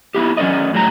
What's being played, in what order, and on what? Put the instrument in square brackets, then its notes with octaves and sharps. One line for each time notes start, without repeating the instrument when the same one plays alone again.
[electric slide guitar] B3 E4 G4
F#3 C#4 F#4 A#4 D5 D#5
A2 F#3 G3 G5 A#5